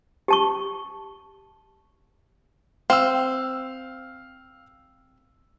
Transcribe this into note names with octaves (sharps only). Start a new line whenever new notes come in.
G4 A5 C#6
C4 F5 E6